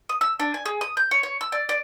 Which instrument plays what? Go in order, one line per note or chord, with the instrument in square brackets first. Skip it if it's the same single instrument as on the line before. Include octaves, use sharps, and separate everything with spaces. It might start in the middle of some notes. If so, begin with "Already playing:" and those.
[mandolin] D#6
E6
D4
G#5
G#4
D#6
G6
C#5
C#5
E6
D5
D5